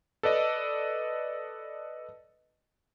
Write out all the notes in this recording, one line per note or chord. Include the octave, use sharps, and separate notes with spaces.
A4 B4 D5 D#5